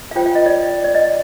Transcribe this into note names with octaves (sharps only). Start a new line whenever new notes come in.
F5
F4 C5 G5
F5
D#5
D5
D5
D#5